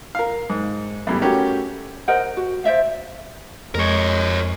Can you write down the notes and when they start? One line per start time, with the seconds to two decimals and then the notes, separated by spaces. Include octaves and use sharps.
0.15 A#4 F5
0.50 G#2
1.07 E2 A2 G3
1.22 A3 C#4 F#4 G4 A#4
2.08 A#4 C5 D#5 F#5
2.37 F#4
2.64 C5 D5 E5 F5
3.75 F2 G#3 A#4 C#5